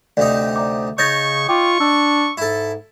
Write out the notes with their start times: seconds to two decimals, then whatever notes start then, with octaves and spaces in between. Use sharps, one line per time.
0.17 D2 C3 D#4 D5 E5
0.56 D5 A#5 D6
0.98 C#3 D#4 C#5 C#6 G6 A6 A#6
1.49 F4 G5 C#6 D6
1.80 D4 E6
2.38 G#2 E4 A4